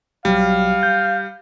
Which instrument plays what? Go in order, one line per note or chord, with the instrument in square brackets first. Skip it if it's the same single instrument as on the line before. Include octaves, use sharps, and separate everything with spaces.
[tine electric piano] B1 F#3 [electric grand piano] G3 [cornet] F5
[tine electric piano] G6